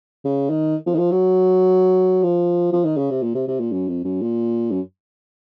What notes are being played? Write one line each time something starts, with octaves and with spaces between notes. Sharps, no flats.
C#3
D#3
F3
D#3
F3
F#3
F3
F3
D#3
C#3
C3
A#2
C3
C3
A#2
F#2
F2
F#2
A#2
F#2